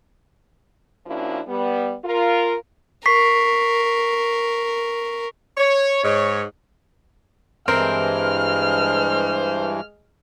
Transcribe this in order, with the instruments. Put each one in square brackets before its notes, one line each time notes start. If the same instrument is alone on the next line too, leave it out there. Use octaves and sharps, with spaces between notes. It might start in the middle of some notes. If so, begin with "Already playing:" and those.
[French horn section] F3 A#3 C#4 D4 E4 F#4
G3 B3
F4 A#4
[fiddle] A#4 [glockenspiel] C#6 B6 C7
[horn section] C#5
G#2 C#5
[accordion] G2 E3 [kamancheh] G#3 F6 [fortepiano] C4 A#4 [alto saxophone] C5